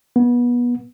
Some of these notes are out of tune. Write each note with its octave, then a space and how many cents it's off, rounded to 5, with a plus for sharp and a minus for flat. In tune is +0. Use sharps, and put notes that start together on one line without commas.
B3 -25